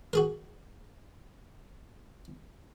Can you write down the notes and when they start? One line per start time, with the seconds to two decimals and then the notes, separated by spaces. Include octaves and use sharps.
0.13 F#4 G#4 A#4